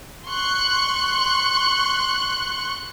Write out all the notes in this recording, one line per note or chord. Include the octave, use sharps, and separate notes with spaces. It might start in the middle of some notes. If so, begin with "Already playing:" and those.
C6 C#6 F#6